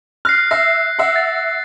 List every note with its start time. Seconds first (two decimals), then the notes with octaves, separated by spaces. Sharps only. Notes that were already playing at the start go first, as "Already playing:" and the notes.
0.25 F6 F#6 A#6 C7
0.51 E5 A#6 C7
0.99 E5 F#5
1.16 A6